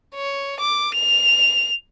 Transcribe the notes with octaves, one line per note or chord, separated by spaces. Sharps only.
C#5
D6
F7